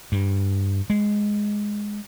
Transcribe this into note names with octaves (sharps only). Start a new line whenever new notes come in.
G2
G#3